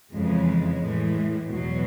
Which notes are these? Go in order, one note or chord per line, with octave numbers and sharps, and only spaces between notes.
F2 C#3 E3 G#3
A2 E3
E2 B2 F#3